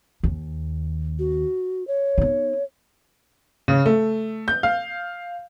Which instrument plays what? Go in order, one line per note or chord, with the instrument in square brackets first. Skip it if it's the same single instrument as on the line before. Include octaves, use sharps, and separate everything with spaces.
[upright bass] D#2
[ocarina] F#4
C#5
[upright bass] B3 D#4
[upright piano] C#3
A3
G6
F5